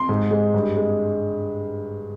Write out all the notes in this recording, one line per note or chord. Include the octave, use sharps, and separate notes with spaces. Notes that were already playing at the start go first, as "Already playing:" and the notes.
Already playing: C6
G#2
G#3
G2
G#3